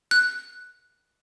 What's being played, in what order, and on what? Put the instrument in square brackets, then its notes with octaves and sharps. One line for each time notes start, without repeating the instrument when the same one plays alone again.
[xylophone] F#6